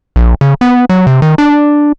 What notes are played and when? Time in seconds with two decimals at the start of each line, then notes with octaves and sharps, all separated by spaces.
0.16 A#1
0.41 C#3
0.61 B3
0.89 F#3
1.07 C3
1.22 D#3
1.38 D4